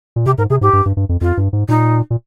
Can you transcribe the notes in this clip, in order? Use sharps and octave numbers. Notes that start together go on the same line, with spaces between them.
A#2
C3 G4
G#2 A#4
C3 G#4
G#2 G4
G2
G2
G2
F2
F2 F4
G2
G#2
A#2 D#4
A#2